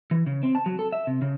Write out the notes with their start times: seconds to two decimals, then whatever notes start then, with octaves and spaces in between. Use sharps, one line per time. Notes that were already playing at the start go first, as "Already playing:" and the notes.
0.11 E3
0.26 C#3
0.43 C4
0.55 A5
0.66 F#3
0.79 A4
0.92 E5
1.07 C3
1.22 C#3